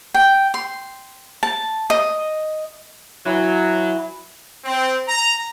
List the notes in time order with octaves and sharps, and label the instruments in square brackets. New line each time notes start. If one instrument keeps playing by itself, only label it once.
[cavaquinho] G5
C6
A5
D#5
[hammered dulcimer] E3 [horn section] F#3
[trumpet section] C4
A#5